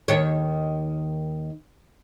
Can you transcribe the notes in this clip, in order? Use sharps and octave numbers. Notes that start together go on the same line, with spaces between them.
D#2 D#3 C#5